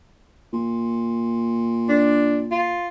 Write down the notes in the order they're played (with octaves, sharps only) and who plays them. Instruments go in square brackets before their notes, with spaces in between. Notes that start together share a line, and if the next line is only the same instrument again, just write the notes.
[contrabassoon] A#2
[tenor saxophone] D4
F4